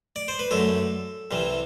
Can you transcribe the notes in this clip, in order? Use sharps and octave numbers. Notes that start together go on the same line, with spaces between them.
D5
C5
B4
F#2 D3 F#3 A3 A4
C2 C3 E3 G3